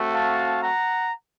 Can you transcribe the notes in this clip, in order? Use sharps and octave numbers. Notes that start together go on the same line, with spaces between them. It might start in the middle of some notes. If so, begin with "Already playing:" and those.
Already playing: A3 C4 F#4
F5 A5
F#5 A#5